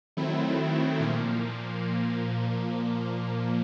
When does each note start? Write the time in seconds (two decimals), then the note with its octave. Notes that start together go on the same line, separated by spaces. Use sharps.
0.17 D#3 F#3 A3 C4 E4
1.00 A#2 F3 A#3